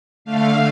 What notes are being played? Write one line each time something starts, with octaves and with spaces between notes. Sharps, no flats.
D3 A3 F5